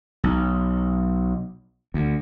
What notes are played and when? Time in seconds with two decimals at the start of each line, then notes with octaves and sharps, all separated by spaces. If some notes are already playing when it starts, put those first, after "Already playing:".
0.24 B1
1.94 D2